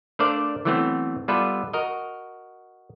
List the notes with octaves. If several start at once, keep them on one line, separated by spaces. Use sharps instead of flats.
A3 D4 A#4 C5 D5 F5
E3 F#3 A3 B3 C4
G3 B3 F4 A4 B4 E5
F#4 A#4 D#5